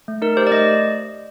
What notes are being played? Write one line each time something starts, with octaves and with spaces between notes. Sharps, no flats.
A3
D#4 A#4
G4 C5
D5
A3 D#5